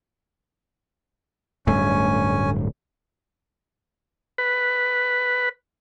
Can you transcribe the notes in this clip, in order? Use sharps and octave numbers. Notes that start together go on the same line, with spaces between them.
D1 G2 A3 C#4 G#5
B4